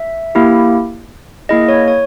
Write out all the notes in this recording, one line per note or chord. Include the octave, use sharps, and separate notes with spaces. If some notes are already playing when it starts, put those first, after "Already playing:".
Already playing: E5
A#3 E4 G4
A#3 E4 G#4 D#5
C#5
C#5